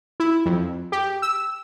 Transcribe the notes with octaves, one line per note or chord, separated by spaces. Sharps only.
E4
F2
G4
E6